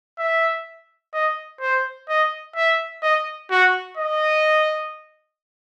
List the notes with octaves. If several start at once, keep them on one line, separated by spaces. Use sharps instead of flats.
E5
D#5
C5
D#5
E5
D#5
F#4
D#5